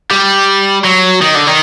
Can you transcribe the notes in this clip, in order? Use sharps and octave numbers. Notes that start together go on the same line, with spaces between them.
G3
F#3
D#3
D3
D#3